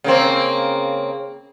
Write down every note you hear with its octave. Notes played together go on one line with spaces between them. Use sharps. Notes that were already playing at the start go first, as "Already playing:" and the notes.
C#3 A#3 C4